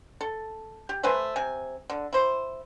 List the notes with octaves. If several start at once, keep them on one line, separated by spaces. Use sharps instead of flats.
A4
G4
A3 B4 C5 G#5
C3 G#5
D3
E4 C5